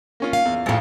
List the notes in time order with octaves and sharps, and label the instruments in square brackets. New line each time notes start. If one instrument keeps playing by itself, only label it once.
[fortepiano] A#3 C#4 F4
[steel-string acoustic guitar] F5
[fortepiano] E2
[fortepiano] G#1 F2 F5 [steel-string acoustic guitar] A2 A4